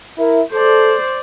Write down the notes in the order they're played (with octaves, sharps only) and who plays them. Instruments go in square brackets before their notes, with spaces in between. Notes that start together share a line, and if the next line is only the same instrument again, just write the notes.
[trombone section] E4 A#4
[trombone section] A4 [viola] C5 D5